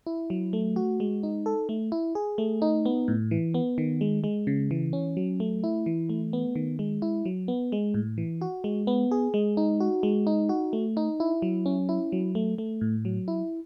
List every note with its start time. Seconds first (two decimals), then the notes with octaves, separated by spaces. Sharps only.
0.06 E4
0.30 F#3
0.53 A3
0.76 F#4
1.00 G#3
1.23 D#4
1.46 A4
1.69 A3
1.92 E4
2.15 G#4
2.38 A3
2.62 D#4
2.85 B3
3.08 A2
3.31 E3
3.54 B3
3.78 D#3
4.01 G#3
4.24 G#3
4.47 C#3
4.71 E3
4.93 C#4
5.17 F#3
5.40 A3
5.64 E4
5.86 E3
6.09 A3
6.33 B3
6.56 D#3
6.79 G#3
7.02 E4
7.25 F#3
7.48 B3
7.72 G#3
7.94 A2
8.18 E3
8.41 F#4
8.64 G#3
8.87 B3
9.11 G#4
9.34 G#3
9.57 D#4
9.80 F#4
10.03 G#3
10.27 D#4
10.49 F#4
10.73 A3
10.97 D#4
11.20 E4
11.42 F#3
11.66 C#4
11.89 E4
12.12 F#3
12.35 A3
12.58 A3
12.81 A2
13.05 F#3
13.28 E4